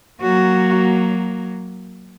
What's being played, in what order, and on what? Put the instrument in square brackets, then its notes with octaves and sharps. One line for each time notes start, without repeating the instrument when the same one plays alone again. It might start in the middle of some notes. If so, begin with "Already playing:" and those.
[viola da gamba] F#3 A#3 [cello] F#4